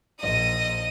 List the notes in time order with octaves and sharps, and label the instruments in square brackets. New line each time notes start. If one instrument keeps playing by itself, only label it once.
[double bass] A#1 [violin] D#5 D#7